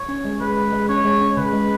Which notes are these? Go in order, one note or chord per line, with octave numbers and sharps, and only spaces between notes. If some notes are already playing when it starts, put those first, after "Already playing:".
Already playing: C#5
C#4
G#3
G#3 B4
G#3
G#3
C#4 C#5
G#3
C#4
C#3 B4
G#3